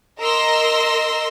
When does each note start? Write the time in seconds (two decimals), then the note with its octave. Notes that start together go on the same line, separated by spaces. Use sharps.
0.20 A#4 D#5 A#5 C6 E6 A#6